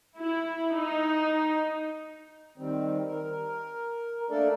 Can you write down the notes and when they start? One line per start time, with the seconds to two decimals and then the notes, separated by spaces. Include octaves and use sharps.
0.16 E4
0.74 D#4
2.58 D#3 G3 C4
3.06 A#4
4.30 A3 A#3 D4 A4 A#4 D5